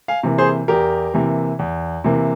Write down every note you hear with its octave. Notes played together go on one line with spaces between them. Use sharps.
F5 G#5
C3 E3 A#3
G#4 C5
E2 G4 A#4
C3 E3 A#3
E2
C3 E3 A#3